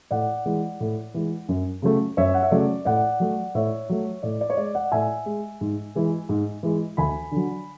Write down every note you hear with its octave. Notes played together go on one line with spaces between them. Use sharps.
A2 D5 F#5
E3 G#3
A2
E3 G#3
F#2
C#3 F#3 A3
F#2 C#5 E5
F#5
E5
C#3 F#3 A3 D5
A2 D5 F#5
F#3 A3
A2 C#5 E5
F#3 A3
A2 D5
D5
C#5
G#3 D5
D5 F#5
A2 E5 G#5
G#3
G#2
E3 G#3
G#2
E3 G#3
D2 G#5 B5
D3 F#3